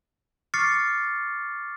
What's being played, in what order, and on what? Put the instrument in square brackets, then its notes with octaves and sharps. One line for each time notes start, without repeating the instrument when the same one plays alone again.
[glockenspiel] C#6 D6 F6 A6 C7 C#7